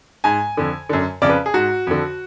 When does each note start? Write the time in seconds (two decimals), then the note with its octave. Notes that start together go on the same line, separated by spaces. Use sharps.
0.24 G#2 G#5
0.57 F2 D3
0.89 F#2 D3
1.22 F2 C#3 D5
1.29 B4
1.46 G#4
1.54 G#2 F#4
1.87 F2 D3